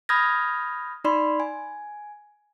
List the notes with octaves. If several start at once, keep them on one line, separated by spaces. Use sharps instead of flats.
B5 D#6 F6 G6 G#6 A#6
D#4 D5 B5 C6
G#5